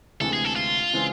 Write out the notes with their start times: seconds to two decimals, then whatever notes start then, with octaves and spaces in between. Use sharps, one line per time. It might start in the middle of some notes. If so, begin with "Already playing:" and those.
0.20 D2 C3 E3 G#3 A4
0.33 G#4
0.44 A4
0.56 F4
0.93 C#3 E3 G#3 C4